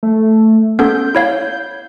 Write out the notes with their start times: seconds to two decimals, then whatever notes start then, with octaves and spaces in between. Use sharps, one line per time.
0.03 A3
0.79 B3 C#4 A4 G6
1.15 E4 C#5 F5